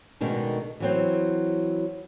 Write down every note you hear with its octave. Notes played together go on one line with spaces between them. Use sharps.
B2 D3 D#3 G#3 A3
E3 F#3 C4